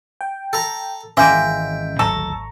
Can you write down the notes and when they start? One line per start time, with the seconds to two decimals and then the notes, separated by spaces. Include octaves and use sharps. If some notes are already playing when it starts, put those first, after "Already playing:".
0.21 G5
0.53 A4 A#5
1.17 G#1 E3 G#3 A#3 C#4 E5 G5
1.99 G#1 D2 D#3 F#3 A4 A#5 C#6